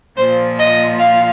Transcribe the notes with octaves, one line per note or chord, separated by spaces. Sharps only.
A#2 F3 C5
D#5
F5